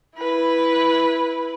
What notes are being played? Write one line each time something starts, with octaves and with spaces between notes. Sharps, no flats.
E4 B4